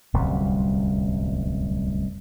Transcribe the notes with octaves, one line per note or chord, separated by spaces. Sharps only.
D1 C2 F#2 G3